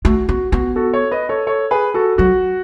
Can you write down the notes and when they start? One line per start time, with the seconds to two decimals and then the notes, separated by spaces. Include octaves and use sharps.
0.05 A3 F#4
0.29 B3 F#4
0.52 B3 F#4
0.76 F#4 A4
0.94 A4 C#5
1.11 B4 D#5
1.29 A4 C#5
1.47 A4 C#5
1.71 G#4 B4
1.94 F#4 A4
2.18 F#3 F#4